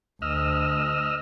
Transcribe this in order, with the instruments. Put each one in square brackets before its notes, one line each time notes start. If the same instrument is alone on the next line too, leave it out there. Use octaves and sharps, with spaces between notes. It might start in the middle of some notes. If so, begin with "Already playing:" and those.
[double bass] D2 [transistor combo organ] D#5 E6 F6